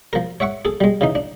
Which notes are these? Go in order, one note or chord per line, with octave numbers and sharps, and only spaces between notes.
F3 A#4
C#5 E5 F#5 C#6
G#4 A4
G3 G#3
C#3 E3 D#4
D4